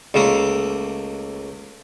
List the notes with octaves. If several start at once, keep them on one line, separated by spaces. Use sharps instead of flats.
C#2 A3 A#3 A#4